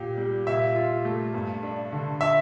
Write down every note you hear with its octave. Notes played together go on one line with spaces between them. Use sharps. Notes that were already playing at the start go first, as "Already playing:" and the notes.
Already playing: A#2 G4
G3
A#2 E5
F4
A3
G2
D4
D3
E5